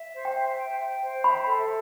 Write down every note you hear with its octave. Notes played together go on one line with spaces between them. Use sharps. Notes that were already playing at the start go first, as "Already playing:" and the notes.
Already playing: E5
C5
G5
E5
G5
G5
C5
E5 B5
A4